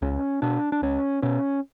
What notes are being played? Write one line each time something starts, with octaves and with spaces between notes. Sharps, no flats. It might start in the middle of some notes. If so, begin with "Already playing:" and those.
C#2 C#4
B2 D4
D4
C#2 C#4
B2 C#4